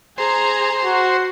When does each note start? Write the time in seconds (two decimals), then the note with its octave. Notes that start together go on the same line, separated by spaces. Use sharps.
0.18 G#4 C5 A#5
0.84 F#4